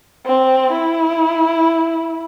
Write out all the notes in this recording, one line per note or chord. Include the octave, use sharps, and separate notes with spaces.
C4
E4